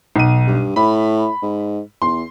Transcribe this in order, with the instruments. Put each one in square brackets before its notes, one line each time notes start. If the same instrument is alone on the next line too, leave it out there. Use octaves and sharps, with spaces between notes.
[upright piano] B1 D#7
[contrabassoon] G2
[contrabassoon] A2 [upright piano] B5
[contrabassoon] G#2
[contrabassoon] E2 [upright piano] C6